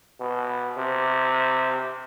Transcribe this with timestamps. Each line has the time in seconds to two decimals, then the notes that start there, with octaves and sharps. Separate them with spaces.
0.20 B2
0.77 C3